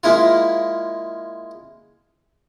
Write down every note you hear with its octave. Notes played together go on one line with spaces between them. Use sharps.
G#3 A#3 E4 F4